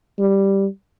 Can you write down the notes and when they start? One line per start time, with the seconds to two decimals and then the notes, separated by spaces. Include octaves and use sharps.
0.19 G3